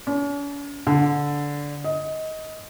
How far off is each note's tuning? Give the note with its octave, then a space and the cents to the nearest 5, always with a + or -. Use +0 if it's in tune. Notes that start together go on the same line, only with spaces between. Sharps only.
C#4 +45
D3 -15
D#5 +20